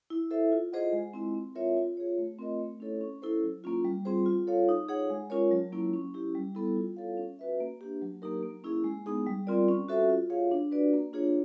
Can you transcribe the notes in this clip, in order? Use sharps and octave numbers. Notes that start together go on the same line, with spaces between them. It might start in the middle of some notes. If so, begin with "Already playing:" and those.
E4
A4 C5 E5
F4
G#4 C5 D#5 F#5
G#3
C4 E4
C4
F4 A#4 C#5 E5
F4
G#4 C#5
A3
C4 F4 A#4 D#5
A3
C#4 E4 A4 C#5
C#4
E4 A4 C5
F#3
A#3 C#4 F4
G3
C4 F4 G#4 C5
F4
A4 C#5 F5
D#4
G#4 C#5 F#5
G#3
C#4 F4 A#4 C#5
F#3
A#3 C#4 E4
C#4
E4 G4
G3
B3 E4 A4
F4
A4 C#5 F5
C#4
F#4 B4 E5
A#3
D4 G4
F#3
A#3 D#4 G4 A#4
A#3
C#4 E4 G#4
G#3
B3 D#4 G#4
G3
C4 F4 A#4 D5
C#4
F#4 A4 C5 E5
F4
G#4 C#5 F5
D4
F#4 B4 D5
A#3
D4 F4 G#4 C#5